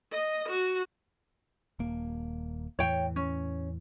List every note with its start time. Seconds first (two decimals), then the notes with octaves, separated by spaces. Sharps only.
0.12 D#5
0.49 F#4
1.79 D#1 A#3
2.79 E2 A2 E3 C#5 G5
3.16 C#4